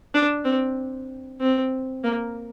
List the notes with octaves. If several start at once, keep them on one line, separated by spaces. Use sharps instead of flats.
D4
C4
C4
A#3